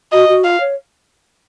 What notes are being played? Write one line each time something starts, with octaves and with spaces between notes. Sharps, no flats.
F#4 D#5
F#4
F4 F5
C#5